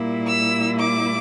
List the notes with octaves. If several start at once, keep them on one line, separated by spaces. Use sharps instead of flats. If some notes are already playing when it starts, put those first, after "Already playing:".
Already playing: A#2 G3 A#3 E4
E6
D6